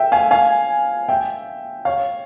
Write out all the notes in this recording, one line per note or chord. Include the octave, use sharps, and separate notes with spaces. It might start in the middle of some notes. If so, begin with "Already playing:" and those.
Already playing: E5 G5
F5 G#5
F5 G#5
E5 G5
C#5 F5